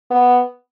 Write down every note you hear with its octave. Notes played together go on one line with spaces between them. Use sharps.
B3